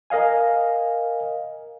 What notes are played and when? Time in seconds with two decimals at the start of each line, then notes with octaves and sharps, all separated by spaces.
0.10 A#4 D#5 F5 G#5